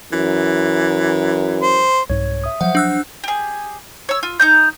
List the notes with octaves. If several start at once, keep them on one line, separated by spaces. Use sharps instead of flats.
F#2 E3
C5
C2 G#2 C#5
E5 D#6
F3 F#3 C5 E5 F#5
D4 E6 F#6
G4 G#4
C#5 E6
F4
D#4 A#5 G6